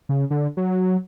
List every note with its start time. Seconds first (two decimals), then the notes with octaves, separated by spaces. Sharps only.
0.09 C#3
0.30 D3
0.57 F#3